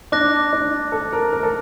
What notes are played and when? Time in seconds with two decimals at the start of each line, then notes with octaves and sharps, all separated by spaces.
0.12 D4 D6 F#6 A#6
0.53 D4
0.92 A4
1.13 A#4
1.33 A#4
1.43 A4